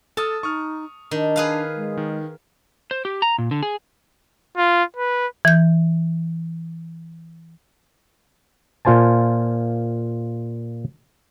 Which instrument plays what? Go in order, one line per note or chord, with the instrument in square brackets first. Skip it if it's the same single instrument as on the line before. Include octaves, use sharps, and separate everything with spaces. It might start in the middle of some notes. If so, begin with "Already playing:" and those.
[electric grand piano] A4 D#6 F6 [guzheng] A5
[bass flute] D#4 [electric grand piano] C#6 D#6 F6
[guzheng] D#3 [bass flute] D4
[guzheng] G#4 B4 F5
[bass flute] G#3
[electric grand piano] D#3
[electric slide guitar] C5
G4
A#5
A#2
D3
G#4
[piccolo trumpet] F4
B4
[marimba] E3 G6
[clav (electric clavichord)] A#2 F4 C5 G#5 A5